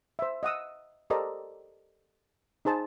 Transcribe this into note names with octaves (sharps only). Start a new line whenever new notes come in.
C5 E5
D#5 F#5 D#6 E6
G4 A4 A#4 C5 D5 D#5
D#4 G#4 C5 A5